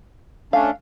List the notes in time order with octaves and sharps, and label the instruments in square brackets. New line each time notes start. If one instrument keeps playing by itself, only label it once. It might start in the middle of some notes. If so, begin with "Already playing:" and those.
[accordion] A3 C#4 D4 [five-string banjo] F5